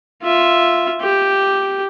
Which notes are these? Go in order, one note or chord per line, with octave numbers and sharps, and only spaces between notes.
F4 E5
G4